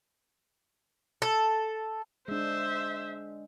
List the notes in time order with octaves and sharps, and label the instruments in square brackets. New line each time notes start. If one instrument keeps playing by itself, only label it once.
[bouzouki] A4
[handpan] G#3 D4 [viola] C5 E5